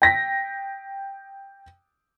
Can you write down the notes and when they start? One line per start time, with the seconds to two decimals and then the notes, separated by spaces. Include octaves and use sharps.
0.02 G5 A#6 B6